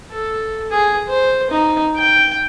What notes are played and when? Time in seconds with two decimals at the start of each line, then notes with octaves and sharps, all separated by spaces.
0.11 A4
0.71 G#4
1.08 C5
1.51 D#4
1.96 G5